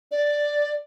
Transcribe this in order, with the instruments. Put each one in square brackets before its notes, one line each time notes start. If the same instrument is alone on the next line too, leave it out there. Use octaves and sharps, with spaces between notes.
[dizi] D5